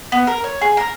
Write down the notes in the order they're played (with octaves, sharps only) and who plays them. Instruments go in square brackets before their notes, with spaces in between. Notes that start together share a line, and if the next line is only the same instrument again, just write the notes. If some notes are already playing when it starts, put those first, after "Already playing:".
[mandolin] B3
A#4
C#5
G#4
A#4